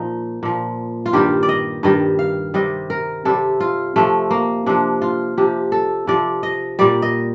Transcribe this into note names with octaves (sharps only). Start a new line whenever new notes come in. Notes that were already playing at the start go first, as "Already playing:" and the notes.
Already playing: A#2 F3 D#4
A#2 F3
F4
G2 D#3 G3 G4
D5
D#5
G2 D#3 G3 D#5
F5
C3 G3 D#5
A#4
C3 G3 A4
F4
C3 F3 A3
A#3
C3 F3 D4
F4
C3 F3 G4
A4
C3 F3 D5
D#5
A#2 G3 D5
D#5